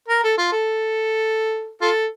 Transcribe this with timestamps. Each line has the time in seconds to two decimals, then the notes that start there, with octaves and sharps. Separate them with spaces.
0.08 A#4
0.23 A4
0.38 F4
0.52 A4
1.81 F4 A4